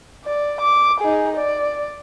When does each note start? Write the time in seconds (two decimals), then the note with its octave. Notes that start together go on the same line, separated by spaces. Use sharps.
0.24 D5
0.61 D6
1.00 D#4 G#4
1.36 D5